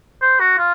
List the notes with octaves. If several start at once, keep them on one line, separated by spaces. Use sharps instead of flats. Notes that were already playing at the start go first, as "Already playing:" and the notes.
C5
F#4
F4